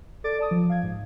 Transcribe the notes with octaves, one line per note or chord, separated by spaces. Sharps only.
A4 D5 D6 A6 D7
D5 A5 D#6
F3
F5 G#6
G#2